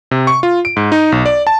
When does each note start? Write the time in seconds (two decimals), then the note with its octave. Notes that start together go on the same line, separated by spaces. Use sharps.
0.11 C3
0.27 C#6
0.43 F4
0.65 D7
0.76 G#2
0.92 D#4
1.12 B1
1.26 D5
1.47 A5